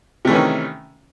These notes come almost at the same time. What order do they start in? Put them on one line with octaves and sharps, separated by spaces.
C3 A3 E3 C#4 D#3